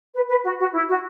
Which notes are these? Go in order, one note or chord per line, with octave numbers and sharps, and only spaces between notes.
B4
B4
F#4
F#4
E4
F#4